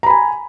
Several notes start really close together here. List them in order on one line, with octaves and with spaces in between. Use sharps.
A#5 B5 G#5